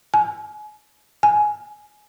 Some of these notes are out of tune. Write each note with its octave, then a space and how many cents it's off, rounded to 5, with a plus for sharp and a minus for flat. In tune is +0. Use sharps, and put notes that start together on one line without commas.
G#5 +35
G#5 +15